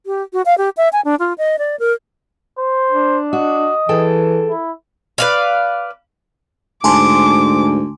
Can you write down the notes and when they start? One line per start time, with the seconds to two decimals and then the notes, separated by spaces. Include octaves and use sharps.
0.06 G4
0.33 F#4
0.46 F5
0.58 G4
0.77 E5
0.93 G#5
1.05 D4
1.19 F4
1.38 D#5
1.59 D5
1.79 A#4
2.58 C5
2.92 D4
3.33 F#4 D#5
3.89 E3 G#4 A4 G5
4.50 E4
5.18 B4 D5 F5
6.84 D2 G#2 G#5 A5 C6 D6